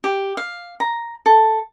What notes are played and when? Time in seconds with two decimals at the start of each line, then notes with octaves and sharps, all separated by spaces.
0.04 G4
0.37 F5
0.80 A#5
1.26 A4